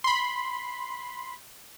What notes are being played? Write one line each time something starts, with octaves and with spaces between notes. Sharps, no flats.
B5 C6